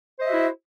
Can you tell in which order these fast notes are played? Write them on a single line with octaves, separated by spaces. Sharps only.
C5 D#5 E5 F#4 E4